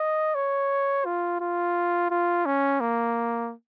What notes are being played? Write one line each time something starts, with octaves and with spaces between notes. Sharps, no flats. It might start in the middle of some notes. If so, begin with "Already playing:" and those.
Already playing: D#5
C#5
F4
F4
F4
C#4
A#3